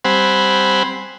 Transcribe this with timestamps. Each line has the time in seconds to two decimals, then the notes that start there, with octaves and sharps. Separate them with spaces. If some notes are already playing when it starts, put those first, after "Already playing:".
0.05 G3 C4 C5 F#5 G#5 B5